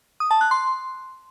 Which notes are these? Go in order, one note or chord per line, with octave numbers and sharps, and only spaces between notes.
D#6
A5
F#6
C6